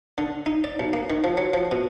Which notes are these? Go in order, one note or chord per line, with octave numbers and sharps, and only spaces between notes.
D3
D#4
D5
B1
A#3
D#3
F3
F#3
F3
B2